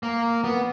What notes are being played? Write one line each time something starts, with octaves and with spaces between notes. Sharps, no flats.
A#3
B3